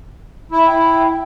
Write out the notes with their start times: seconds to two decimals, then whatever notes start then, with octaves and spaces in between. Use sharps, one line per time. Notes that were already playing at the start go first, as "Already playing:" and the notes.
0.52 E4
0.66 E4 G5
1.09 G5